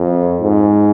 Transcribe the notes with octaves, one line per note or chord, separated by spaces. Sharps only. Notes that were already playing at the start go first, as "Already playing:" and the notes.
Already playing: F2
G#2